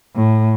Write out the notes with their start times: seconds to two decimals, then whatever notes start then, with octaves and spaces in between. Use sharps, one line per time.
0.16 A2